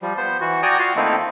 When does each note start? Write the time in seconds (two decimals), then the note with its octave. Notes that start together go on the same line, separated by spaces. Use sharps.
0.02 F3 G3
0.17 B3 C5
0.41 E3 F#4
0.63 F#4 D5 G5 G#5 A#5 D#6
0.79 F4 F#4 F5
0.96 D#3 A3 A#3 C4 D#4 E4